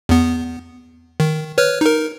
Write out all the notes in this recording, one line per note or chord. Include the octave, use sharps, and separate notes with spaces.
E2 B3
D#3
B4 C#5 F6
D#4 A#4